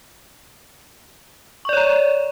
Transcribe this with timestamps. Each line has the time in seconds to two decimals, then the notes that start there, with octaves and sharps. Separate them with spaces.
1.65 C#6
1.69 D5
1.73 C#5
1.77 A#5